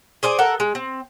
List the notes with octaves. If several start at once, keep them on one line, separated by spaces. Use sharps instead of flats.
G#4 C5 D5 G#5
A4 A#4 F#5
G#3
C4